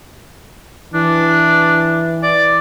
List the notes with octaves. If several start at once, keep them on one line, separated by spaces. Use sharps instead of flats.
E3 D4
D5